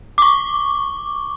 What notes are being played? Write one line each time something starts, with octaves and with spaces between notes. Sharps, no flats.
C#6 D6